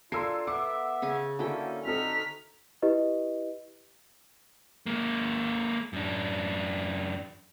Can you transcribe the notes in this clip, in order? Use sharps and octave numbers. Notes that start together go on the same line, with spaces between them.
D4 F4 A4 A#4 G#5 C6 E6 C7
B3 E5 F#5 D6
C#3 G#4 G#5
D3 A#3 C#4 E4 F#4 A4 G5
C4 D#4 F#4 A4 A#4 F6 B6
E4 G4 B4 D#5
G#3 A#3
F#2 D4